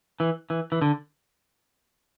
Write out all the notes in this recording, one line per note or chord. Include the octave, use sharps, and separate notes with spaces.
E3
E3
E3
D3